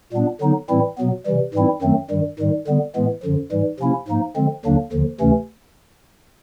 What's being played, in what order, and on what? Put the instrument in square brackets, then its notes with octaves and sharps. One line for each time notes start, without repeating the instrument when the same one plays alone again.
[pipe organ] A#2 G3 B3 D4
D3 F#3 B3 D#4
A2 E3 G3 C4 E4
B2 F#3 B3
C3 E3 G3
G#2 E3 G3 C4 E4
F#2 D#3 F#3 A3 C4
G2 D#3 G3
G#2 D#3 G3
D3 G3 B3
A2 E3 G#3 B3
F#2 D3 F3
G#2 E3 G3
C3 F3 A#3 C#4 E4
G#2 F3 A#3 D#4
D3 F3 G#3 C4
D#2 D3 F#3 A#3 D4
D#2 D3 F3
D2 C3 E3 A3 C#4